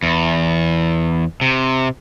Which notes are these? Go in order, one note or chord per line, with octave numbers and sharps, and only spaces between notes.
E2
C3